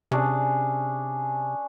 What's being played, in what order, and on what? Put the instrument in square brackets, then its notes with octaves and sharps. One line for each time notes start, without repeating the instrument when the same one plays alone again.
[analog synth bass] C3 [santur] C#4 D4 G#4